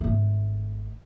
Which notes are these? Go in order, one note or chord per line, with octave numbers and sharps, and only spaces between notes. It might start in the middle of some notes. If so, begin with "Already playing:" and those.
G#1 A3